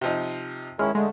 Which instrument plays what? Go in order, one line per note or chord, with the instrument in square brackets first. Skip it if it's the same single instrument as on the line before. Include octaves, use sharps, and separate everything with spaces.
[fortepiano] C3 F3 D#4
[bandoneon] D#3 C#4 E4 [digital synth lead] G#3 [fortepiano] F6
[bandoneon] D3 A3 [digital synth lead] G#3